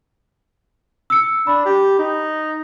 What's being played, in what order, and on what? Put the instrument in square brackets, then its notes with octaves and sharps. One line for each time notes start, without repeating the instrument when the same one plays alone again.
[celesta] E6 C#7
[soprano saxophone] D4 [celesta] B5
[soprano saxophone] G4
D#4